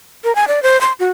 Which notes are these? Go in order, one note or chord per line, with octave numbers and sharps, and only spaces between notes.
A#4
G#5
D5
C5
C6
F#4